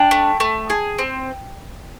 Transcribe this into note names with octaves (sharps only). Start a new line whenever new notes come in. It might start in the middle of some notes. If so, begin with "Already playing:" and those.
Already playing: D4 G5 A5
A3
A3
G#4
C4